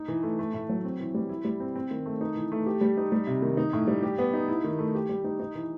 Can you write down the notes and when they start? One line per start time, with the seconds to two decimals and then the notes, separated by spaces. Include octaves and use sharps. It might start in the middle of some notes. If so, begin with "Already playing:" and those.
Already playing: D#4
0.08 E3
0.23 A3
0.39 A3
0.53 A2
0.69 F#3
0.84 C4
1.00 E3
1.14 G3
1.29 E4
1.45 G3
1.60 C4
1.75 C4
1.91 D#3
2.06 A3
2.21 D#4
2.36 E3
2.52 A3
2.66 G4
2.81 G3
2.97 D#4
3.12 G3
3.27 C3
3.42 D#3
3.57 D#4
3.73 A2
3.87 G3
4.03 G4
4.18 B3
4.34 D#4
4.48 E4
4.64 D#3
4.79 A3
4.95 G4
5.09 G3
5.24 D#4
5.40 D#4
5.55 E3